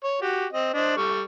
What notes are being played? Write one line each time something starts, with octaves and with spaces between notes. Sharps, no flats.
C#5
F#4 G4
C4 D#5
D4 C5 D#5
G3 A4 C#6